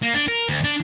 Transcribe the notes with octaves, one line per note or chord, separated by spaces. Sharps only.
A#3
D4
A#4
D2
D4